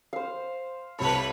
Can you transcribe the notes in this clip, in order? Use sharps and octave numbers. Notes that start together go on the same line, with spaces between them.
C5 F5
C2 C3 A4 B4 C#5 B5